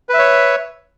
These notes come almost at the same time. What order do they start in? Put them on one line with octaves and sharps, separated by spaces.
B4 E5 C#5